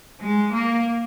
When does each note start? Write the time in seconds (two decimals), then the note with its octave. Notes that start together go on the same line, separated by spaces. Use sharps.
0.20 G#3
0.53 A#3